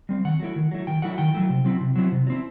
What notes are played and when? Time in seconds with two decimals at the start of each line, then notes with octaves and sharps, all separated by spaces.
0.09 G3 C4
0.25 D#3 F#5
0.40 F#3 A3 E4
0.56 D#3
0.71 F#3 A3 E4
0.87 D#3 G5
1.02 F#3 A3 E4 F#5
1.18 D#3 G5
1.34 F#3 A3 E4
1.50 C3
1.65 F#3 C4 E4
1.81 C3
1.96 F#3 C4 E4
2.12 C3
2.27 F#3
2.30 C4 E4